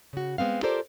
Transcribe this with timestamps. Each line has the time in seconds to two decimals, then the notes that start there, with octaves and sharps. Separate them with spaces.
0.13 C#3 F#4
0.38 G#3 B3 C4 F5
0.63 F4 G4 A4 A#4 C5 D5